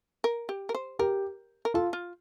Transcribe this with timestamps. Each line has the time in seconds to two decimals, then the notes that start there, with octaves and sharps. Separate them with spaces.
0.24 A#4
0.49 G4
0.69 A#4
0.75 C5
0.99 G4 A#4
1.65 A#4
1.74 F4 A4
1.93 F4